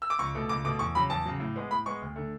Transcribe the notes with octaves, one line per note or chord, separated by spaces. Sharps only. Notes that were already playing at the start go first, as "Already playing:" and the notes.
E6
D6
C#2 C#6
B2 A3
C#2 D6
B2 A3 D6
E2 C#6
C#3 F#3 B5
E2 A5
C#3 F#3
A2
G#3 B3
A2 B5
G#3 B3 C#6
D2
D3 A3